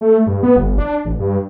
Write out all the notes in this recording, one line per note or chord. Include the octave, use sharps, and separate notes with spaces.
A3
G2
B3
G1
D4
A1
G2